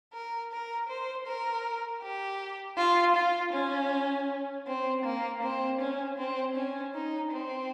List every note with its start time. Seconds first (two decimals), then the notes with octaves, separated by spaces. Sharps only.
0.13 A#4
0.52 A#4
0.89 C5
1.27 A#4
2.02 G4
2.78 F4
3.16 F4
3.53 C#4
4.67 C4
5.05 A#3
5.43 C4
5.81 C#4
6.18 C4
6.56 C#4
6.94 D#4
7.32 C4